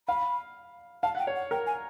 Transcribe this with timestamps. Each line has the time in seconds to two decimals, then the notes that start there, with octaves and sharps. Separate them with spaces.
0.08 F5 B5
1.03 F5 A5
1.15 F#5
1.19 G5
1.27 C#5
1.35 F#5
1.51 A#4 G5
1.67 G#5